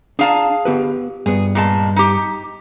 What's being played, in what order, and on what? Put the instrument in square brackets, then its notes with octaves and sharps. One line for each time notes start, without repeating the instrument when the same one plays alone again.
[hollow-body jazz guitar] D4 A#5 [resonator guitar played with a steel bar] G#4 F5 A5
[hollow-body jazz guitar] B3 G4 B4
[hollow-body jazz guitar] G2 B3 [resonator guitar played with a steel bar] G#4
[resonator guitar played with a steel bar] A#2 G#3 A5
D#4 G4